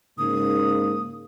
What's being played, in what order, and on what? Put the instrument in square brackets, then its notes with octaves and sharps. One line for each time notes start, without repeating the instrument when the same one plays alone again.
[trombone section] G#2 C#3 A#3 [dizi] D#6